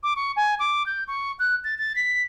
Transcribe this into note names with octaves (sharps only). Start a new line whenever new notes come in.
D6
C#6
G#5
D6
G6
C#6
F#6
A6
A6
B6